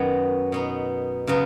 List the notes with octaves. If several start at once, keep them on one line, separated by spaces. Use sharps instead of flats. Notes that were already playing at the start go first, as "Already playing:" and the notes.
Already playing: F#2 D#3 F#3 B3
B2 B3 D#4
C#3 F#3 B3